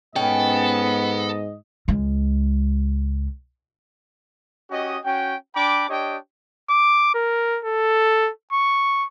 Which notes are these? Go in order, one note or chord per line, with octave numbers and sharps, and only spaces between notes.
G#2 B3 C#4 A4 D#5 G5
C#2 G#3
C#4 F#4 G4 D#5
C#4 F#4 G5
D4 G5 B5 D6
D4 G4 C#5 D#5 G5
D6
A#4
A4
C#6